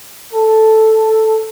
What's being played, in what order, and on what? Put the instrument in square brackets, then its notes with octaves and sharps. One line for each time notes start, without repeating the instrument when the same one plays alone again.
[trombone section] A4